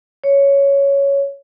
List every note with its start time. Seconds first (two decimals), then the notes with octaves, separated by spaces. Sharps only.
0.24 C#5